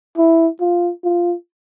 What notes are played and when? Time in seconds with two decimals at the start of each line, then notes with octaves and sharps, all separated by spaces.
0.17 E4
0.61 F4
1.04 F4